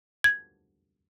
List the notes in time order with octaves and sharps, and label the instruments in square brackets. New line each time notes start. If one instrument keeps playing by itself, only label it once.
[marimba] G#6